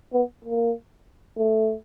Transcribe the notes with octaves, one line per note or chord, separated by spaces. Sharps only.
B3
A#3
A3